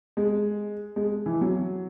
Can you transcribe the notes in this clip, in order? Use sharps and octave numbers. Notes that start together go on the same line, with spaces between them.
G#3
G#3
E3
F#3